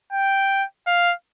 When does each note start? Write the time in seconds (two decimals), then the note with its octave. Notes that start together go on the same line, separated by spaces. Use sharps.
0.13 G5
0.87 F5